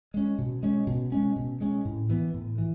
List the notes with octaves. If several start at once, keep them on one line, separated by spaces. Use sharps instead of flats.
G#3 C#4
B2
G#3 C#4
B2
G#3 C#4
B2
G#3 C#4
A2
E3 B3
A2
E3